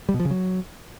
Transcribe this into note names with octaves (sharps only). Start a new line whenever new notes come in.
G3
B2
F3
C#3
F#3